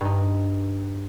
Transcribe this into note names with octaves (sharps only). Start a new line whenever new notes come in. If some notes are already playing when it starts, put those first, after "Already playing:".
G2 D#4